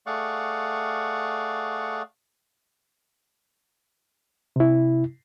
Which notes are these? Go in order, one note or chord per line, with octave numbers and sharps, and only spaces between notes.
A3 G#4 D5 F5 F#5 C#6
C3 E4